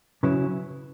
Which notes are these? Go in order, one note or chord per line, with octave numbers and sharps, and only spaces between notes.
C#3 F#3 C#4 E4 B4